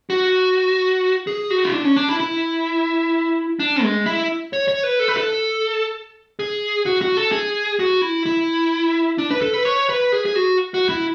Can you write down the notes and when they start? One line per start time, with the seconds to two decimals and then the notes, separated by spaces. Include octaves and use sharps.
0.10 F#4
1.27 G#4
1.50 F#4
1.64 E4
1.73 D4
1.85 C#4
1.96 D4
2.09 E4
2.19 E4
3.59 D4
3.83 G#3
4.06 E4
4.53 C#5
4.68 C#5
4.83 B4
4.99 A4
5.08 B4
5.17 A4
6.39 G#4
6.86 F#4
7.02 F#4
7.17 A4
7.32 G#4
7.79 F#4
8.02 E4
8.26 E4
9.18 D4
9.31 B4
9.41 A4
9.54 B4
9.65 C#5
9.89 B4
10.12 G#4
10.25 G#4
10.35 F#4
10.74 F#4
10.89 E4